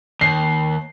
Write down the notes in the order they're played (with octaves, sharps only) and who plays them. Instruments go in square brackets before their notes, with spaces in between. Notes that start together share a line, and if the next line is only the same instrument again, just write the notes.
[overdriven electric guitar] D#2 [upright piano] C7